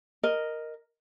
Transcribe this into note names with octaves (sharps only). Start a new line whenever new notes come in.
A#4 D#5